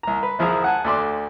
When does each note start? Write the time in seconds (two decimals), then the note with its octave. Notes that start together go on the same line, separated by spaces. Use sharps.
0.03 C2 A#5
0.23 B4
0.39 C2 F3 E4 G#4 A#5
0.64 F#5 G#5 A5
0.85 D2 A3 D5 C6 D6